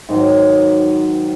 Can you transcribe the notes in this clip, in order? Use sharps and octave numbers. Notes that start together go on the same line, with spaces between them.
G#2 D#3 F#3